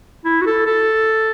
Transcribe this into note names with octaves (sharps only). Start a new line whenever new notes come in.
E4
F#4
A4
A4